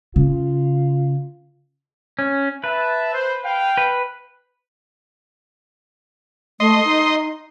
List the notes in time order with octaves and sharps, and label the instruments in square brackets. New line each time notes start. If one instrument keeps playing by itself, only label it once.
[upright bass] C#3 [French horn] F4
[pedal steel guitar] C#4
[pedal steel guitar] B4 [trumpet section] E5 A5
[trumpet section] C5
F5 G5
[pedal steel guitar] B4
[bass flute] A3 [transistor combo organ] D#5 C6
[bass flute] D#4